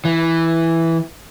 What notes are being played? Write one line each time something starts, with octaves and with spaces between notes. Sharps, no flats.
E3